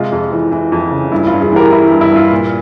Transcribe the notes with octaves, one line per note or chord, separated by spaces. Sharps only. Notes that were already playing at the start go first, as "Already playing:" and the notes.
Already playing: C3 G#3 F4
F2
E3
E3
F2
C#3
G2 E4
G2 F4
F4 G#4
E3 G4 A#4
E3 E4
G2
E4
G2 F4
A#2